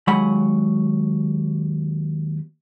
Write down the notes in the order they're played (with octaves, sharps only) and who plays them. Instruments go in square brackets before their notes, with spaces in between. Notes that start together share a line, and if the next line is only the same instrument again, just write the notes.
[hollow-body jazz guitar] D#2 F#3 G#3 F#5 G#5 B5